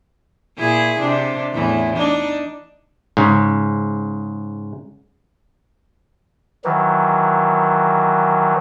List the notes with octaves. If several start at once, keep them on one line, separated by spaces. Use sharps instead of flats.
A#2 E4 G#4
C3 D4
E2 A2 E3
D4 D#4
G#2 C#3
D#3 E3 F#3